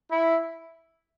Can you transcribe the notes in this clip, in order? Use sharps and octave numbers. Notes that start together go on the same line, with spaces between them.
E4